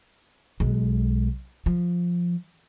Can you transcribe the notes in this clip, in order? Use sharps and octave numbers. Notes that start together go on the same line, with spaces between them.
B1 G#3
F3